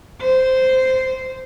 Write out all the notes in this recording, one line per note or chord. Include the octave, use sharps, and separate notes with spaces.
C5